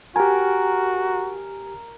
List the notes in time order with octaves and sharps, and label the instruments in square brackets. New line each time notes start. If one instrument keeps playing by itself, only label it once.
[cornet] F#4 [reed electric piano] G4 G#5 [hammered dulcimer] A#4